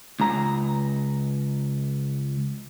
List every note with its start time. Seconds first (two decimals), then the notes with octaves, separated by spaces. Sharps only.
0.20 C#2 A#5